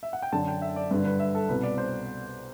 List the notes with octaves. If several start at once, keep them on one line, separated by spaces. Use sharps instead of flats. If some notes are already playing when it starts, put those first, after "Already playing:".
E5
F#5
G5
F#2 D3 A5
G5
E5
D5
G2 D3 B4
B4
E5
A4
C2 B2 B4
D5
C5